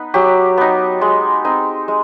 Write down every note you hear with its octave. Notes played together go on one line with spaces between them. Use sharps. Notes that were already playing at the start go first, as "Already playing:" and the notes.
Already playing: B3 D#4 B4
F#3 G4
B3 D#4
G#3
C4 D#4
G#3